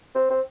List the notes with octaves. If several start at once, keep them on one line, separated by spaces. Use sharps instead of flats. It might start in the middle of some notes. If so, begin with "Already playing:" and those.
C4
C4